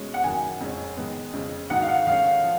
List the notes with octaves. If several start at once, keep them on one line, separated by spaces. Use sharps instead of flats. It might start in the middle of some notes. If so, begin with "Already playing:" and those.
Already playing: B2 G#3 C#4
F#5
F#2 D#3 A#3 G#5
F2 C#3 G#3 C#4
D#3 G#3 B3
F2 C#3 G#3
G#2 D#3 A#3 D#4 F#4 F#5
F5
F#5
D#3 G#3 C#4 F5
F3